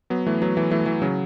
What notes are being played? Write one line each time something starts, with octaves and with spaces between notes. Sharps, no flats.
F#3 B3
E3 A3
F#3 B3
E3 A3
E3 A3
E3
C#3 F#3